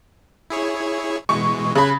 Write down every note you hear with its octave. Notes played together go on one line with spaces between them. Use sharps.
E4 G#4 C#5
B2 E3 G#3 C#6
C#3 B5 F#6 G#6